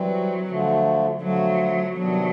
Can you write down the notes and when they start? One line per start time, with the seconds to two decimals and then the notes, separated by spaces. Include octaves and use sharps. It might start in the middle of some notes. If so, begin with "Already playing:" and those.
Already playing: E3 F#3 G3 C4
0.48 D3 F3 A3
1.21 D3 F3 F#3 A3
1.95 C3 D#3 F#3 G3 B3 D4